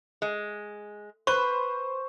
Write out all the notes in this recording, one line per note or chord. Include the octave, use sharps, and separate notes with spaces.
G#3
B4 C5 C#6